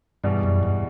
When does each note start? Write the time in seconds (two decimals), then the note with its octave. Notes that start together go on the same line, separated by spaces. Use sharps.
0.24 E2 G2 B2 G3
0.43 F#2
0.63 G2